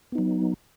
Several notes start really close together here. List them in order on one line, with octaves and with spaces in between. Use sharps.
B3 D#4 F#3